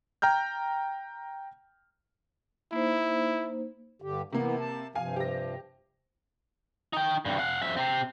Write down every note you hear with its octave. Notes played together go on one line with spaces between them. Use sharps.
G5 A#5 F6 G6
A#3 D#4 E4 C5
G2 D3 G4
C3 E3 A#3 B3
A5
G2 C3 F3 F5 G#5
G4 A#6
D#4 G5
G2 C3
F5 F#5
F2 E5
C3 C4